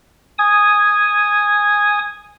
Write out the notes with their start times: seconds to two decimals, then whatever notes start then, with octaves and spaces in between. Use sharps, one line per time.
0.39 G#5 D#6